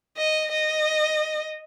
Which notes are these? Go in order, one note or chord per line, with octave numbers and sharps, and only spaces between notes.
D#5
D#5